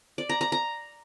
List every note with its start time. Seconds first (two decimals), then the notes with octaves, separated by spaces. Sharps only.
0.18 D5
0.29 A#5
0.41 A#5
0.52 A#5